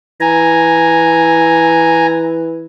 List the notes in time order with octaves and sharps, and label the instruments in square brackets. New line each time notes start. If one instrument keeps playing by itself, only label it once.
[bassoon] E3 [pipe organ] G#5 A#5